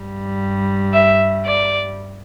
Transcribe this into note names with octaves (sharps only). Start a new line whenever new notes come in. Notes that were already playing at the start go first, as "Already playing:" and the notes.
Already playing: G2 G3
E5
D5